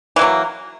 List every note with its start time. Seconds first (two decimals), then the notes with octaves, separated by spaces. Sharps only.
0.16 E3
0.19 A#3
0.21 F#3